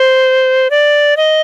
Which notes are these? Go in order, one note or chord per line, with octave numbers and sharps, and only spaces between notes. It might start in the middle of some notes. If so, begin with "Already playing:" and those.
Already playing: C5
D5
D#5